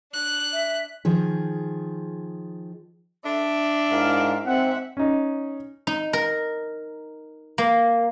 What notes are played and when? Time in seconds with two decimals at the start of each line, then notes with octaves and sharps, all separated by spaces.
0.12 D4 F#6
0.53 E5
1.05 D#3 F3 G#4
3.25 D4 E5
3.91 G#2 E4 A#4 F5
4.46 G#2 C4 E5 F#5
4.97 C#4 D#4
5.87 D#4
6.13 A#4
7.58 A#3